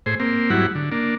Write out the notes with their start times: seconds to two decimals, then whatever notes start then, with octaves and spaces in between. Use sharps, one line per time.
0.06 A2 G#4 C5
0.20 A#3 C4
0.50 G#2 F#3 G3 E4 F#5
0.75 D3
0.92 A#3 D4